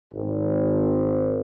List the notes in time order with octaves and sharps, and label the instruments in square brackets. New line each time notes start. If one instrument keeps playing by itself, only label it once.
[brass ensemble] G#1